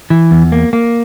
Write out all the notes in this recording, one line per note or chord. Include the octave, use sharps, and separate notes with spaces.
E3
E2
A#3
A#3